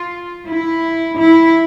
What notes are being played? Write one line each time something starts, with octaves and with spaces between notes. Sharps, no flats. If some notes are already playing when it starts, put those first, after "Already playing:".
Already playing: F4
E4
E4